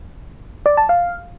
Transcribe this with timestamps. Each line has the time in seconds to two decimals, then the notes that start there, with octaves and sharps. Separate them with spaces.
0.66 D5
0.77 A5
0.89 F5